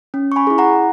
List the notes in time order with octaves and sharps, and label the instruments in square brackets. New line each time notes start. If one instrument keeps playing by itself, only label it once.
[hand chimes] C#4
C#6
G#5 B5
E4 G#4
F#5 A#5